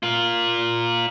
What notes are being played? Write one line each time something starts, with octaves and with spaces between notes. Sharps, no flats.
F4 A#4